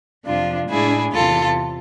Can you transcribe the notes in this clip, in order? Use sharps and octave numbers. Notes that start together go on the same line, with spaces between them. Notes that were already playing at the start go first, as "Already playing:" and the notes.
F2 C3 F3 D4 F4
A2 G#3 D4 E4 G#4
E2 C3 E3 F4 A4